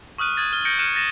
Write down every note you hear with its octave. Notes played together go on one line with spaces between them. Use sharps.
C#6 D#6 F6 F#6 D#7
D#6 G#6 A6
F6 G7
G6 A#6 C#7 D7
F6 F#6 C#7 D#7 E7
A6 A#6 D#7 E7